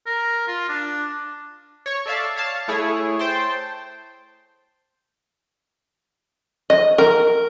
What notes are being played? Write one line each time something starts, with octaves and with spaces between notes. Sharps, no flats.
A#4
F4
D4
C#5 C#6
A4 D5 E5 F5 A5
C#5 F5 A5
A3 E4 G#4 C#5
C5 G5 A5 C6
D#5
A#4